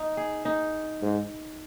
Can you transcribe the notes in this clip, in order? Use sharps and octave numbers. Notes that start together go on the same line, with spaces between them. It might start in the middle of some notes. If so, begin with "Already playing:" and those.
Already playing: D#4
G#4
D#4
G#2